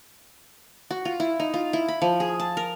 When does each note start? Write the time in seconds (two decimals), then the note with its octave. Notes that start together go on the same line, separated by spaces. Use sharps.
0.91 F#4
1.05 F4
1.20 E4
1.40 D#4
1.54 F4
1.73 E4
1.88 B5
2.02 F3
2.20 G#4
2.40 A5
2.57 A#4